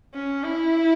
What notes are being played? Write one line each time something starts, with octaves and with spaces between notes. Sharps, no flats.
C#4
E4